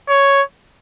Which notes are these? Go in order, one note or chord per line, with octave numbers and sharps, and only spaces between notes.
C#5